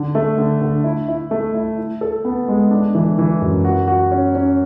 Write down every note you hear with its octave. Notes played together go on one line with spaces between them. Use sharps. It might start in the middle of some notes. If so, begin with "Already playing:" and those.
Already playing: D3
A3
D3
D3
E4
E4
A3
E4
E4
A4
B3
G#3
D4
E3
E3
F#2
F#4
F#4
C#4
C#4